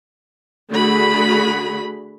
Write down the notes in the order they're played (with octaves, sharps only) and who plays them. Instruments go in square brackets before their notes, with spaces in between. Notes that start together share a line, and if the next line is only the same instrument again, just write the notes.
[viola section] D3 A3 F#4 G#4 B5